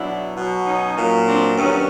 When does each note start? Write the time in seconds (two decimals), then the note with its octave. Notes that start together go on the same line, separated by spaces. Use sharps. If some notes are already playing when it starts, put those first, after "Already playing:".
Already playing: B2 F#3 D4 E4
0.37 B2 F#3
0.66 C#4 D#4
0.97 A#2 F#3
1.27 C4 D4
1.57 G2 D#3 F#3 B3 C#4